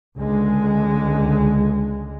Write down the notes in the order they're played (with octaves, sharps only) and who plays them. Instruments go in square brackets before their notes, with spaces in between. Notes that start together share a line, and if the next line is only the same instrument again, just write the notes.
[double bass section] C#2 D3 G#3